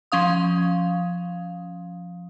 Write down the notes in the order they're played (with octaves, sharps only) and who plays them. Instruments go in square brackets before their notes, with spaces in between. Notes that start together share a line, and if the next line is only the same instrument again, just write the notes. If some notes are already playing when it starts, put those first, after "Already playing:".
[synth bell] F3 C#4 F5 D#6